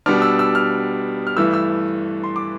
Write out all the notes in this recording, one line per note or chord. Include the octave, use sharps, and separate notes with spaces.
B2 G3 B3 D4 F6
E6
E6
F6
F6
G2 E3 A3 E6
E6
C6
D6